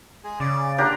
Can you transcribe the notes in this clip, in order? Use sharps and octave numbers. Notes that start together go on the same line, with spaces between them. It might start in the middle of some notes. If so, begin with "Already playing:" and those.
G#3 G#4 G#5
C#3 D5 D6
A#3 D4 F4 G4 A#4 F#5